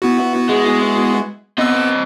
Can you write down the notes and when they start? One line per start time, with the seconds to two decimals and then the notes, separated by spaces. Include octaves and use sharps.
0.02 B3 E4 F#4
0.49 G#3
1.58 B3 C4 D#5 E6